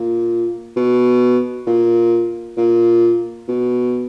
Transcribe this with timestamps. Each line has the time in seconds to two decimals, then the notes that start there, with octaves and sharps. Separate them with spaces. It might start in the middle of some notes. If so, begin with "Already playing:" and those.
Already playing: A#2
0.76 B2
1.67 A#2
2.57 A#2
3.48 B2